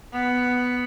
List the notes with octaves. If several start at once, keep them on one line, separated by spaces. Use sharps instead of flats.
B3